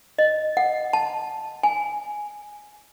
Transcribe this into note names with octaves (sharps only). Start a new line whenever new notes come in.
D#5
F#5
A5
G#5